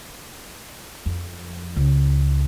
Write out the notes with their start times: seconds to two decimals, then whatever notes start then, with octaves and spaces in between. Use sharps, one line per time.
1.06 F2
1.76 C#2